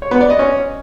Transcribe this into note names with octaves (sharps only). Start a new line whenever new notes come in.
C#5
B3
D5
D#5
C#4